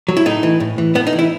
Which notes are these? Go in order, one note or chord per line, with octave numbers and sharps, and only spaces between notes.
F#3
E4
A2 D#4
E3
A2
E3
A2 B3
D#4
E3
E4